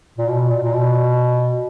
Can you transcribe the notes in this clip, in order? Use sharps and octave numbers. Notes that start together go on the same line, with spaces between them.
A#2
B2
A#2
A#2
B2